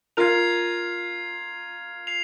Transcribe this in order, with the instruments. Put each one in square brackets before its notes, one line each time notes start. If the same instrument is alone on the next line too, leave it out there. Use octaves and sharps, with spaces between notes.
[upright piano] F4 A#4 [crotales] G#6 C7 F7
[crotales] C7 F7